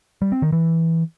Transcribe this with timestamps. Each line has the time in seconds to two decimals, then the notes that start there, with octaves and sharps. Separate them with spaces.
0.22 G3
0.32 C4
0.42 D#3
0.52 E3